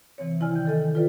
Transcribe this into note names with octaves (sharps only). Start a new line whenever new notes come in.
C3 E3 C4 C#5
C3 D#3 E4 D5 G#5 F6
G5 G6
D#3 A4 D#5
F4 A4 B4 D5 E5